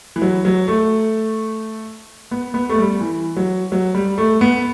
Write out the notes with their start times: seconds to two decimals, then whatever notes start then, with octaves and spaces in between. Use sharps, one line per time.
0.16 E3
0.22 F#3
0.45 F#3
0.68 A3
2.31 B3
2.54 B3
2.69 A3
2.78 G3
3.01 E3
3.37 F#3
3.72 F#3
3.95 G3
4.18 A3
4.41 B3